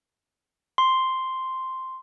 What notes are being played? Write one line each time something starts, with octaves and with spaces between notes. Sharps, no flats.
C6